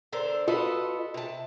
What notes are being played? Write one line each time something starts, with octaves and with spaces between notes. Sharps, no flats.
D3 A4 A#4 C5
F4 F#4 A4 B4 D#5
C3 A5